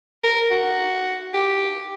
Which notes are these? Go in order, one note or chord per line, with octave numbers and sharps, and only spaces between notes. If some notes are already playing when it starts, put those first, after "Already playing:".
A#4
F#4
G4